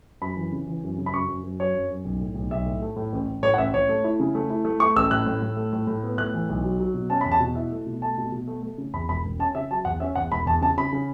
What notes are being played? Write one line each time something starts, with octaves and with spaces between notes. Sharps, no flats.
F#2 B5
E3
C#3
E3
F#2
C#3
B5
F#2 C#6
F#2
F#2
F#3 C#5
F#2
F#2
B1
A2
B1
B1 E5
A2
A3
A2
A1
A1
A2 C#5
F#5
A1 E5
A1 C#5
A3
E4
C#3
A3
E4
A3
A3 C#6
A1 E6
A2 F#6
A2
A2
A3
A2
A2
B3
A2 F#6
E3
B1
F#3
F#3
B2
C#4 A5
E2 B5
A5
B2
E4 E5
A3
B2
A3 A5
B2
B2
A3
A3
C#3
E2 B5
E1 B5
E1
C#4 A5
C#3 E5
F#3 A5
E2 F#5
C#4 E5
E2 F#5
E1 B5
E2 A5
C#3 A5
C#3 B5
C#3